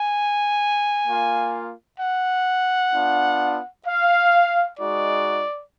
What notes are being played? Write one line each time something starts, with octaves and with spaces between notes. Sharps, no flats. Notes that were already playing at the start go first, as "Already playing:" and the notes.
Already playing: G#5
A#3 F4
F#5
B3 D4 F4
F5
G#3 D#4 F#4 D5